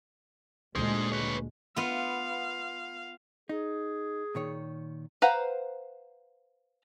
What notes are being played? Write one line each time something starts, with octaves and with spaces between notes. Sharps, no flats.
D2 A#2 D3 G#3 G#4 C5
B4 C#5
B3 F4 F5
D#4 G#4
A#2 D#3 C#5
B4 C5 F5 F#5 A#5